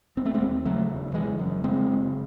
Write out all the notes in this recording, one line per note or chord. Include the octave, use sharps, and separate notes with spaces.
E1 C4
A3
G#3 C4
D#2
C#3 F#3 A3
E1
F#1 E3 G#3
F#2
C#3 G#3 C4
F#1